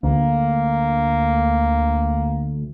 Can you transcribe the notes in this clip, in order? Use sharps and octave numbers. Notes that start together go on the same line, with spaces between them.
D2 A#3